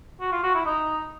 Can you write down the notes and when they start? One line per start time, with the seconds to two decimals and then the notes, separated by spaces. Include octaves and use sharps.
0.21 F#4
0.32 F4
0.43 F#4
0.54 E4
0.66 D#4